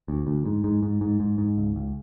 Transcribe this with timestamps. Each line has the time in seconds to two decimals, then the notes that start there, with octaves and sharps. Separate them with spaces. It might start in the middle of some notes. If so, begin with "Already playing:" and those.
0.08 D2
0.27 D2
0.46 G#2
0.64 G#2
0.83 G#2
1.01 G#2
1.20 G#2
1.38 G#2
1.58 C#2
1.76 C#2